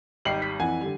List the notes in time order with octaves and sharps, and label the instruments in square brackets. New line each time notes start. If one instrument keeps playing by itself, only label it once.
[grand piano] G#1 G3 F#7 [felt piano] D#4 G5 C7
[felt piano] B6
[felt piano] F2 E3 F#5 [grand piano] G#5
[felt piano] D3 G3